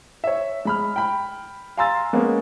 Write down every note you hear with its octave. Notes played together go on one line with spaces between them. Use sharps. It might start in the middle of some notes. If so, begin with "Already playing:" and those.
C#5 E5
G#3 B5 F6
G5 B5
F5 G#5 A#5 C6 E6 A6
G#3 A#3 B3 C#4